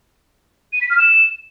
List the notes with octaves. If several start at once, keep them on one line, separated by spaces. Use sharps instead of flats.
D#7
B6
F6
E7